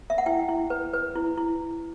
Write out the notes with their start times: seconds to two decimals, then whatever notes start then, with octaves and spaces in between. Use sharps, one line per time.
0.10 E5
0.18 F#5
0.26 E4 G5
0.49 E4
0.70 B4
0.94 B4
1.16 E4
1.38 E4